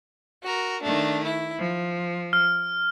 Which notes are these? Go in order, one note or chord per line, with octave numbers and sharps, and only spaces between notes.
F#4 A#4
D#3 A3 D4
E4
F3
F6